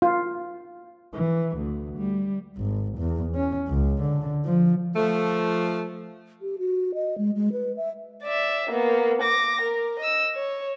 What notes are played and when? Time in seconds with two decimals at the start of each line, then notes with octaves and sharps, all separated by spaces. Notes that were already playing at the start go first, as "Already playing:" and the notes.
0.02 F4
1.13 E3
1.57 D2
1.98 G3
2.57 G#1
2.98 E2
3.34 C#4
3.69 C#2
4.02 D3
4.45 F3
4.96 F3 A3
6.42 G4
6.59 F#4
6.94 D#5
7.18 G#3
7.36 G#3
7.53 B4
7.77 E5
8.23 D5 E5
8.70 A#3 B3
9.22 D6 A#6
9.61 A#4
9.99 D#5 E6
10.35 C#5